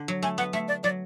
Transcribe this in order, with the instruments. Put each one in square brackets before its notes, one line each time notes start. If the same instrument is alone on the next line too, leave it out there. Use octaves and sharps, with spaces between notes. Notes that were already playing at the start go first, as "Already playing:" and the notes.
Already playing: [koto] D3
F#3
[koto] A3 [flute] G#5
[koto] B3 [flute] F#5
[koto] A3 [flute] E5
[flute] D5
[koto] F#3 [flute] D5